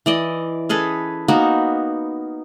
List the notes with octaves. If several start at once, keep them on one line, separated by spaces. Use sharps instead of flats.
E3 D5 D#5
C#4 G#4 A4 B4
A#3 B3 D#4 F#4